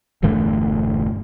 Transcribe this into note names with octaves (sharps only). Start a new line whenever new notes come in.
E1 G2 D3 A3